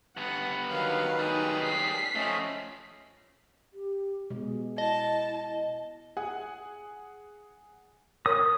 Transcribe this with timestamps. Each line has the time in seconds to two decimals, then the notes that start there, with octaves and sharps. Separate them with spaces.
0.17 G2 B3 F#5
0.68 D#3 F#3 B4 F5
1.19 G3 D#4 G#4
1.61 B6 C7
2.15 F3 A3 C#4 D#5
3.73 G4
4.30 B2 G#3 G#4
4.78 E4 D#5 A5
6.17 G#4 F#5 G#5
8.26 A#4 C#5 D#6